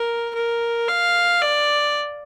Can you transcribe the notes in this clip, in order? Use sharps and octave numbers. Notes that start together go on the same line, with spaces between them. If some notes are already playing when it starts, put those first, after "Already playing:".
Already playing: A#4
A#4
F5
D5